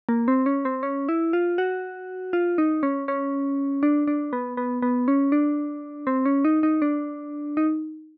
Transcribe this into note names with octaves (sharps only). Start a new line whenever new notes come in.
A#3
C4
C#4
C4
C#4
E4
F4
F#4
F4
D#4
C#4
C#4
D4
D4
B3
B3
B3
C#4
D4
C4
C#4
D#4
D#4
D4
D#4